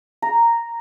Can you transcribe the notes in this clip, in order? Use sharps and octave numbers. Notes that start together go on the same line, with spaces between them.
A#5